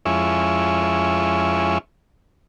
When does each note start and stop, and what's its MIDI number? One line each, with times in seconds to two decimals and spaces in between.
0.06 1.78 41
0.06 1.78 56
0.06 1.78 61
0.06 1.78 64